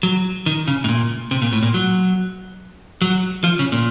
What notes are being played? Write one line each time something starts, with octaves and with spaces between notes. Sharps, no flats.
F#3
D#3
C#3
A2
A#2
C3
A#2
A2
A#2
F#3
F#3
F3
C#3
A#2